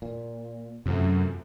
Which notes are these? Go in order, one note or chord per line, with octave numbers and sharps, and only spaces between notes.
A#2
F#2 C3 F3 A3